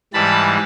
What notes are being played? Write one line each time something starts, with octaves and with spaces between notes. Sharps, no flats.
G#2 E3 G3 A5 B5